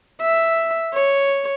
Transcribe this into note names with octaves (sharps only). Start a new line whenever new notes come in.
E5
C#5